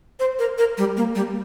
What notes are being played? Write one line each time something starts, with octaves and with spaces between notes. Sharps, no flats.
C5
A#4
A#4
G3
A#3
G3